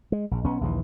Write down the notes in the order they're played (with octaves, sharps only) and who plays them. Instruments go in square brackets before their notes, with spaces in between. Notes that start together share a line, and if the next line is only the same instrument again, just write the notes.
[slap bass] G#3
A#1
B1 B3 C#4
A#1 D#2 D3 E3